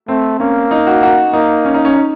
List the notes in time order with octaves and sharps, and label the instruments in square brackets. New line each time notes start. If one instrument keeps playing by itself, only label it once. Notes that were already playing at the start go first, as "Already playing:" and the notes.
[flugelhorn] A3 [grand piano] C4
[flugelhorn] A#3 [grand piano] C#4
[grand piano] D#4
F#4
F#4
[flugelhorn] A#3 [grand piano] D#4
[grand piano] C#4
D#4
C#4
D#4